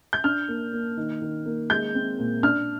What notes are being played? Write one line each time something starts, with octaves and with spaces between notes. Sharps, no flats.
G6
D4 F6
A#3
A#3
D#3
D#3
A#3
G#3 G6
C4
A#2
D4 F6